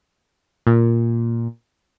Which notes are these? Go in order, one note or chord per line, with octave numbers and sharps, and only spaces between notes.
A#2